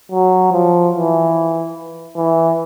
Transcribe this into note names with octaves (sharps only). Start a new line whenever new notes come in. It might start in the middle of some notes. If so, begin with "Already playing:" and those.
F#3
F3
E3
E3